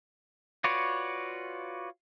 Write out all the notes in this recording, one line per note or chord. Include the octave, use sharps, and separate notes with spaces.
F4 F#4 B4 C#5 D5